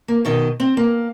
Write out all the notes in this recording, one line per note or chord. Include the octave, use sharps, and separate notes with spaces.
A#3
B2 D#3 D#5
C4
A#3